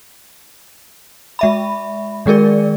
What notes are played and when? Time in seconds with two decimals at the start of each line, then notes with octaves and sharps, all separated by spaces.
1.39 G#3 E5 B5
2.26 D#3 G#3 G#4 A#4 D5